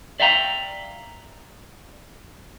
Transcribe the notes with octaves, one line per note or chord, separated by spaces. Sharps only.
D5 E5 F5 G5 A#5